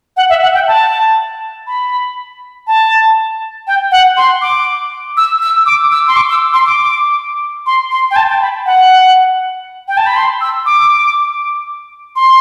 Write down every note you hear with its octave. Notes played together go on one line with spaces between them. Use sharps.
F#5
E5
F#5
G5
A5
B5
A5
G5
F#5
C6
D6
E6
E6
D6
E6
C6
D6
E6
C6
D6
C6
C6
G5
A5
G5
B5
F#5
G5
A5
B5
C6
E6
D6
C6